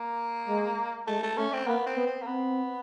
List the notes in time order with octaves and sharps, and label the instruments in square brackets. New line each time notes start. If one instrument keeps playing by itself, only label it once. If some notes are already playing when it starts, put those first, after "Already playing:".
Already playing: [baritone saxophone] A#3
[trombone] G#3
[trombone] G#3 [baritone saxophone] A3
[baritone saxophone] A3
[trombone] A3 [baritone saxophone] C#4
[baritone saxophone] C4
[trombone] A#3 [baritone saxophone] B3
[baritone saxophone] C4
[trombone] B3
[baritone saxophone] C4
A#3
[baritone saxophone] B3 [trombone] C4